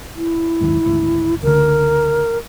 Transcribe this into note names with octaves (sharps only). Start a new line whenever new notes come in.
E4
F#1 D#2 G#2
G#1 D2
C#2 D3 A#4